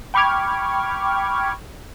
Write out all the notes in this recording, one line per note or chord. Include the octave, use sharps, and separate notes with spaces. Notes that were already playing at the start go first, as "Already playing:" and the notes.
G5 B5 C#6 D6 F6 G#6